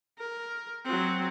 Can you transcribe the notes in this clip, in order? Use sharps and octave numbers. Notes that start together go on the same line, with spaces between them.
A#4
F#3 C4